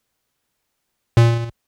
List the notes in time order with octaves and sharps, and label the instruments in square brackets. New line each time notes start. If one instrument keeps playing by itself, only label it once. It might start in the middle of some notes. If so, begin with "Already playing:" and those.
[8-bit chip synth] A#2